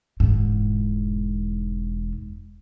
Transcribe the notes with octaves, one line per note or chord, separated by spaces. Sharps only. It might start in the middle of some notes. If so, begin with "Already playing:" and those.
E1 G#2